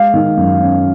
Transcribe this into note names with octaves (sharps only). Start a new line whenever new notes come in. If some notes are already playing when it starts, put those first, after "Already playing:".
Already playing: G#3 F5
D#3
F#2
C#4